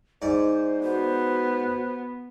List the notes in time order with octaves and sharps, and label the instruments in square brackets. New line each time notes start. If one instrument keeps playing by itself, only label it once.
[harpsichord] G#2 D5 [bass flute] C5
[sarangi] B3 [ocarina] F#4